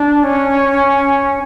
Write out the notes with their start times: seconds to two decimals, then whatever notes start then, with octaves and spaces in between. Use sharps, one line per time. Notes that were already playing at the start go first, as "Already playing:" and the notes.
Already playing: D4
0.23 C#4